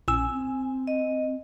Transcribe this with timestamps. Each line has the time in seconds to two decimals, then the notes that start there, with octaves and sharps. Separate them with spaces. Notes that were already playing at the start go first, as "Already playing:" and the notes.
0.08 A#1 C#4 G#5 E6
0.31 C4
0.87 D#5